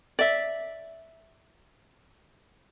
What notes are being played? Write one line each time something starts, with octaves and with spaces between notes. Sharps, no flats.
D5 E5